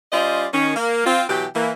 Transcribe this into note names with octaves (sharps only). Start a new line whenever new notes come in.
G3 C#4 F4 C5 D5 D#5
D#3 C#4
A#3
C4 F4
B2 E3 F#3 G4
E3 A#3